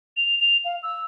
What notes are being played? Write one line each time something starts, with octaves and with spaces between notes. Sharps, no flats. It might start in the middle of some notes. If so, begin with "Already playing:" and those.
F7
F7
F5
E6